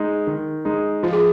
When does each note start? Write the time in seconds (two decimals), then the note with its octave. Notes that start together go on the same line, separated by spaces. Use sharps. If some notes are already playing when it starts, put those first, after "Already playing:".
Already playing: G#3 D#4
0.27 D#3
0.65 G#3 D#4
1.03 F3 F4
1.13 G#4